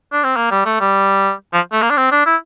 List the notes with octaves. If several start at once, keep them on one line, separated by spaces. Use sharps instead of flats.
D4
C4
A#3
G3
A3
G3
F3
A3
A#3
D4
C4
D4
E4